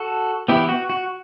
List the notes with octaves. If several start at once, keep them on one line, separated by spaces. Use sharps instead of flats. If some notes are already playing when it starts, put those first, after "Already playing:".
Already playing: F#4 A4
E3 B3 E4 G4
F#4
F#4